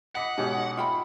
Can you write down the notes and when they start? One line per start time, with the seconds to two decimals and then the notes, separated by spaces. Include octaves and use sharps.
0.15 D#5 F#5 B5 D6 B6 C#7
0.38 G#2 B2 A3 C#4 G4
0.77 F4 E5 G5 B5